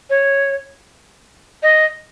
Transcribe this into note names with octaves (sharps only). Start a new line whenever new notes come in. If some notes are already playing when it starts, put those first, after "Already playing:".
C#5
D#5